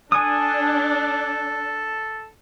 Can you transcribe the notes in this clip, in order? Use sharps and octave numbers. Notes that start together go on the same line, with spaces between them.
D4 A4 G#5 D#6